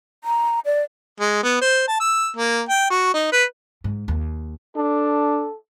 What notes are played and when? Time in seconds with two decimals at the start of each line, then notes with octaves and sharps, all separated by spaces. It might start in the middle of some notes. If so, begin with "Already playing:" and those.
0.24 A#5
0.65 D5
1.20 G#3
1.43 B3
1.61 C5
1.88 A5
2.00 E6
2.37 A#3
2.69 G5
2.90 F#4
3.14 D#4
3.32 B4
3.84 G#2
4.08 D#2
4.76 D4 A4